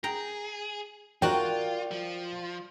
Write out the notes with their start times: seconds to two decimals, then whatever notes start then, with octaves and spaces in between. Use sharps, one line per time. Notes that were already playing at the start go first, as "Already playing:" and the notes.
0.04 G#4 G5 A#5
1.22 F4 F#4 A#4 D5 G5
1.91 F3